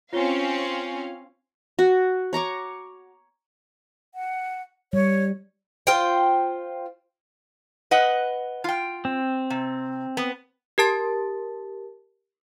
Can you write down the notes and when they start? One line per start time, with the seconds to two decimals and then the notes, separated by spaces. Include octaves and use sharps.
0.13 C4 C#4 F4 C#5 F5 G7
1.79 F#4
2.33 C#5 A#5 C#6 D6
4.15 F#5
4.93 G3 C#5
5.87 F4 C5 G5
7.91 B4 D#5 F#5
8.64 F4 G5
9.05 C4
9.50 C3
10.17 B3
10.78 G4 A#4 A5 A6